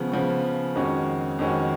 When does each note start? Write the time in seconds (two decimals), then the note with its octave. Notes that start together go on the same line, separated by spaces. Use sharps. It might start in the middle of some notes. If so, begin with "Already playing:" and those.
Already playing: C#3 F3 B3
0.12 C#3 F3 B3
0.76 F2 D#3 G#3 C#4 F#4
1.39 F2 D#3 G#3 C#4 F#4